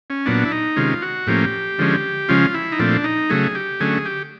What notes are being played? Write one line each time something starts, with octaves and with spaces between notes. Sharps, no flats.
C#4
A#2 F#3 B3 D4
E4
D#4
C3 D#3 G#3 C#4 F4
F#4
A2 F3 A#3 C#4 G4
D3 F3 G#3 C#4
C#3 F3 G#3 C#4 F4
E4
D#4
A#2 F3 A3 C4 D4
D#4
C#3 F#3 A3 G#4
G4
D3 F#3 A3 C#4 G#4
G4